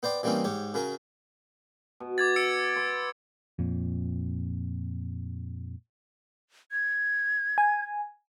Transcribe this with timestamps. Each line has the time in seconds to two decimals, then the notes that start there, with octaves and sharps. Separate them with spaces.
0.03 B3 C5 D5 G5
0.23 E3 G3 A#3 C4 C#4 D#4
0.44 G#2 G4 C#5
0.74 C#3 F#3 C#4 A#4
2.00 B2
2.18 D6 G#6 A6
2.36 E6 C#7 D7
2.76 B4 C6
3.59 F2 A#2
6.72 G#6
7.58 G#5